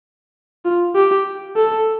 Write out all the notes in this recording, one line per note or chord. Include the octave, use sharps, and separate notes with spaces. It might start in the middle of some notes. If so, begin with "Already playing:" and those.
F4
G4
A4